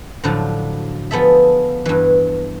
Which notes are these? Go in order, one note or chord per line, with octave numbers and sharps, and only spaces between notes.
A2 D3 F3 F#3
F3 B3 G#4 A4 E5
G2 E3